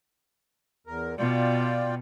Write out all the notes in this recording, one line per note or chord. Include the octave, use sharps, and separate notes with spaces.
E2 A#4
B2 F4 D5 G5